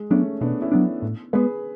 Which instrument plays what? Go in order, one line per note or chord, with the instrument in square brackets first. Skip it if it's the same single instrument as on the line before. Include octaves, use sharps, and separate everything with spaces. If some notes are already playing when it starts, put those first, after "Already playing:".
Already playing: [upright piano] G#3
[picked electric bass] F#3 B3 D4 [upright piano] A3 C#4
[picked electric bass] B2 [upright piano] B3 D4
[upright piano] C#4 E4
[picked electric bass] F#3 B3 D4
A2
[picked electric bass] G#3 B3 [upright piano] G#4 B4